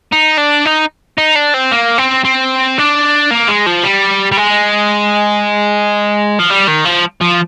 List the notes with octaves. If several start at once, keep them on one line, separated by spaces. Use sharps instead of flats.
D#4
D4
D#4
D#4
D4
C4
A#3
C4
C4
D4
A#3
G#3
F3
G3
G3
G#3
F3
G3
D#3
F3
F3